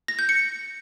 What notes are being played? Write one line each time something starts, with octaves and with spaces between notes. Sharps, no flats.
A#6
G6
C#7